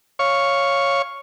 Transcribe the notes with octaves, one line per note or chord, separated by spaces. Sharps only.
C#5 F5 C#6